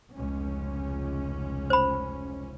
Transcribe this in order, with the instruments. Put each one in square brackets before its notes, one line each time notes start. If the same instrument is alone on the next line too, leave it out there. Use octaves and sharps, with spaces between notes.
[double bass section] F1 C#2 C#4
[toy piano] C5 B5